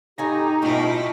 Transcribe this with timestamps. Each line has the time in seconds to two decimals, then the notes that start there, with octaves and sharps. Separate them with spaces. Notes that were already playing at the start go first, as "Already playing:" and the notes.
0.18 A2 D#4 G4 G#5 A#5
0.62 B2 A3 C#4 E4 F4 G4